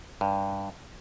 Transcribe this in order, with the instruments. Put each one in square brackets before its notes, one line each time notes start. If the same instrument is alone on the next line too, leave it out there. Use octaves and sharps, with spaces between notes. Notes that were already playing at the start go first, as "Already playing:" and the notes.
[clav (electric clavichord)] G2